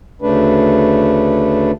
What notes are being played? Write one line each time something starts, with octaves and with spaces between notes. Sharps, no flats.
D2 C#3 A3 D4 B4